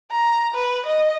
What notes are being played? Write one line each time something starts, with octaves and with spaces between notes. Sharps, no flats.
A#5
B4
D#5